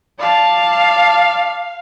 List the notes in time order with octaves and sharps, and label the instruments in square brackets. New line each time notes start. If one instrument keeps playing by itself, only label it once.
[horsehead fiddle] D5 A5 [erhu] F5